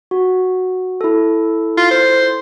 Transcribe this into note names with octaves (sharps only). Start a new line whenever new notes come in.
F#4
E4 A4
F4
C5